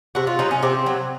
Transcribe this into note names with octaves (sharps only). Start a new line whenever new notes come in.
C3 F#4
F4
F#3 D#4
C#4
C3 C4
F#3